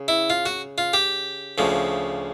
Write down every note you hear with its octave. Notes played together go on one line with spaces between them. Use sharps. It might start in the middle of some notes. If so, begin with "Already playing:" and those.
Already playing: C#3
E4
F4
F#4
F4
G4
D2 C#3 F3